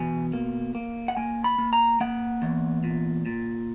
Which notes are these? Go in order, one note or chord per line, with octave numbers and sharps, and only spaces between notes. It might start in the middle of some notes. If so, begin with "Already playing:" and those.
Already playing: E2 B2 G#5
A#3
A#3
F#5
A#3 G#5
B5
A#3
A#5
A#3 F#5
E2
A#2
A#2